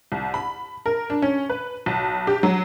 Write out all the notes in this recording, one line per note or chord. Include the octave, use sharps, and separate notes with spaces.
C2
B5
A#4
D4
C#4
B4
B1
G4
F#3